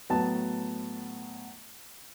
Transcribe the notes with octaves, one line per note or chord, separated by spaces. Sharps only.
A2 F#3 B3 A5